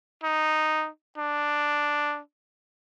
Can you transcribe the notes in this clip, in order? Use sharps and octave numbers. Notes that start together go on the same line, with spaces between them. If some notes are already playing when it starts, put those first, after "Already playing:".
D#4
D4